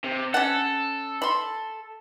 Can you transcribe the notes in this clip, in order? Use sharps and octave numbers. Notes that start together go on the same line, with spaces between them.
C3
C#4 A4 F#5
B5 C6